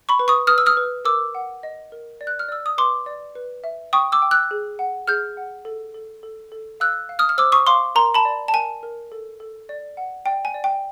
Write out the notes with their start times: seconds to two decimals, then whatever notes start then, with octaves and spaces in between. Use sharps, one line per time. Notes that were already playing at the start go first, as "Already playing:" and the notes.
0.09 B5 C#6
0.19 B4
0.28 C#6 D#6
0.47 B4 D#6 F6
0.58 E6
0.66 D#6 F6
0.77 B4
1.05 A#4 D6 E6
1.35 F#5
1.63 D#5
1.92 A#4
2.21 D5
2.27 F#6
2.39 F6
2.48 D5 E6
2.66 D#6
2.78 B4 C6 D6
3.06 D5
3.35 B4
3.64 E5
3.93 G5 C#6 D#6
4.12 D6 E6
4.22 G5
4.31 E6 F#6
4.51 G#4
4.79 F#5
5.08 G#4 F6 G6
5.37 F#5
5.65 A4
5.94 A4
6.23 A4
6.52 A4
6.80 F5 E6 F#6
7.09 F5
7.19 D#6 F6
7.29 F6
7.38 C5 D6 E6
7.52 C#6 D#6
7.67 F5 C6 D6
7.95 A#4 A#5 C6
8.14 A5 B5
8.25 D5
8.48 A5
8.53 A#4 G#5
8.83 A#4
9.12 A4
9.40 A4
9.69 D5
9.97 F#5
10.26 D5 G5
10.45 G#5
10.54 D5
10.64 G5